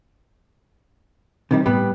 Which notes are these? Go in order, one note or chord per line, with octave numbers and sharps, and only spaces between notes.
C3 D#3 E3 G3
A2 G3 B3 E4